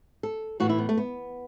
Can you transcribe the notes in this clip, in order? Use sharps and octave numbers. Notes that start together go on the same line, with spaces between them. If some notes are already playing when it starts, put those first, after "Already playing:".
A4
A2 E3 F#4
E4
B3
A3
B3